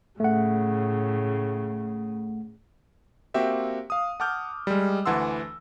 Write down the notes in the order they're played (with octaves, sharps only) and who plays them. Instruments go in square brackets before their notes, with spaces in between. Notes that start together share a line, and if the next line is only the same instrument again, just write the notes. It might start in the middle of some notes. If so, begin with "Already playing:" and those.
[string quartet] A2 C#3 [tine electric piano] A3 F#5
[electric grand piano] A#3 C4 F#4 G4 E5 G5
F5 D#6
F#5 A5 D6 F6 G6
G3 G#3
D2 E3 F#5 A5 C6 E6